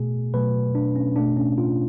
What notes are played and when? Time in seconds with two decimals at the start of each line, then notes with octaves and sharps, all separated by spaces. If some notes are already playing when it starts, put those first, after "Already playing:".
Already playing: B2 A3 G#4
0.33 B2 F#3 A3 B4
0.75 D4
0.96 C#4
1.16 B2 A3 D4
1.37 C#4
1.58 F4